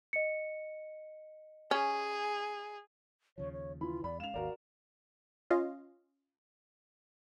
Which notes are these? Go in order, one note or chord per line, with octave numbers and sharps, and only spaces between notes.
D#5 C#7
C#4 G#4
D#2 C#3 F3 C#5
C#5
E3 F4 B5
E2 D5 B5
G#3 C#4 F5 E7 F7
G#1 D#2 F#4 A#4 D5
C#4 F4 D#5 F5